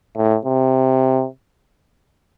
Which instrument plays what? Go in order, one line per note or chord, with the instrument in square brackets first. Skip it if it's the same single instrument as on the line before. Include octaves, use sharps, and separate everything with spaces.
[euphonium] A2
C3